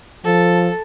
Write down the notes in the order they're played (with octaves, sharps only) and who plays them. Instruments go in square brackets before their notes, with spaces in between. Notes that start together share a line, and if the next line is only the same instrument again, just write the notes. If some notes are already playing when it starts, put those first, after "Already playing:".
[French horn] F3 [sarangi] A4